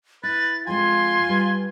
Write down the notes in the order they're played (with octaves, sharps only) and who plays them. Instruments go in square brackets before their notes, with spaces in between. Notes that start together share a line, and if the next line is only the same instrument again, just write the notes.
[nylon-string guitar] E4 [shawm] B4 [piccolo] A6
[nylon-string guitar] F2 G#3 [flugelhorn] F4 [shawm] G#5 [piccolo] C6
[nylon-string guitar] G3 B4